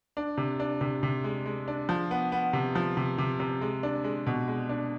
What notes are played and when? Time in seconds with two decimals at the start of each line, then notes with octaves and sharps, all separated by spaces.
0.17 D4
0.38 C3
0.60 D4
0.81 C3
1.03 C3
1.24 G#3
1.46 G#3
1.68 D4
1.89 F3
2.11 B3
2.32 B3
2.53 C3
2.75 F3
2.97 C3
3.18 C3
3.40 C3
3.61 G#3
3.83 D4
4.04 G#3
4.27 B2
4.48 G#3
4.69 D4